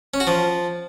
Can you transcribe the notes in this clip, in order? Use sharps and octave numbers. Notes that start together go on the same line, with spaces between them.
C#4
F#4
F3